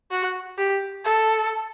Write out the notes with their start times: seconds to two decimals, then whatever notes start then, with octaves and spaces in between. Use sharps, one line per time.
0.11 F#4
0.58 G4
1.05 A4